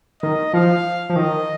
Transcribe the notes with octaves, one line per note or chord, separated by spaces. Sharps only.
D#3 D#5
F3 F5
F3
D#3 D#5